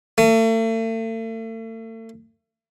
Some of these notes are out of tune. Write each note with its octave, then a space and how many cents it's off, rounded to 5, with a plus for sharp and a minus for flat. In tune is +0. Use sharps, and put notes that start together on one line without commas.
A3 +40